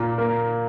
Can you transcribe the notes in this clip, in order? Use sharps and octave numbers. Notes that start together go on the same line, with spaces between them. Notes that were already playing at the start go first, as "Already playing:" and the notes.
Already playing: A#2 A#3
A#3